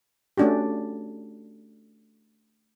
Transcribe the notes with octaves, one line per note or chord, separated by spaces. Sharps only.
A3 C#4 D4 F#4 G4